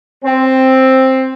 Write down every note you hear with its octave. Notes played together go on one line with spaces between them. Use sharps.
C4